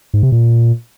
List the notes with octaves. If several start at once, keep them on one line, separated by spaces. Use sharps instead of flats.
G#2
C3
A#2